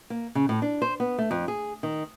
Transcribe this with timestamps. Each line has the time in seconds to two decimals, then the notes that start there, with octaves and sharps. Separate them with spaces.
0.10 A#3
0.35 C#3
0.49 A2
0.62 D4
0.82 C5
1.00 B3
1.18 A3
1.31 F2
1.48 G#4
1.83 D#3